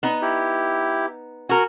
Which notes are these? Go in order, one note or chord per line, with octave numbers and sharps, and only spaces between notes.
B3 D#4
E4 G4
F#4 A#4 G#5